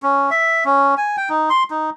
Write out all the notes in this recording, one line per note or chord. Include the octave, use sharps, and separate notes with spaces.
C#4
E5
C#4
G#5
G5
D#4
C6
D#4